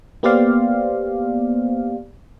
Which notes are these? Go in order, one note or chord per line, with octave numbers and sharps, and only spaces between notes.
A#3 B3 G4 C5 D5 F5